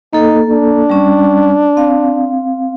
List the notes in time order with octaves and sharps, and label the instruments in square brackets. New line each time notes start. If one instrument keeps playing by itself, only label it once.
[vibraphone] A#3 A4 [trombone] D#4
[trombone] D4
[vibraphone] G3 C#4
C4 F5